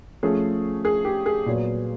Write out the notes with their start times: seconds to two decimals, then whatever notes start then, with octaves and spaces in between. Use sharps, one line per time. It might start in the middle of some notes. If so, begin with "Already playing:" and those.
0.23 F3 A3 C#4 G#4
0.85 G#4
1.05 G4
1.26 G#4
1.46 A#2 F#3 B3